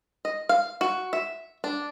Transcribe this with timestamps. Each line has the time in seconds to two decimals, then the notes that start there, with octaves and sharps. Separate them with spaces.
0.25 D#5
0.49 F5
0.81 F#4
1.13 E5
1.64 D4